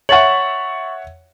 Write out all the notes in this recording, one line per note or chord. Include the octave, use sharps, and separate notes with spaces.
C#5 E5 F#5 C#6 A6 F#7